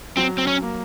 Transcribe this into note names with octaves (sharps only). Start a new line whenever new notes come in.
F#3 C4
C4
C#4
A#3